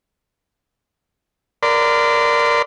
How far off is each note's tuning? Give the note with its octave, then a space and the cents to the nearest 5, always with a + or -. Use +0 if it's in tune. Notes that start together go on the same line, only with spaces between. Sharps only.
A#4 +0 D5 +0 C6 -40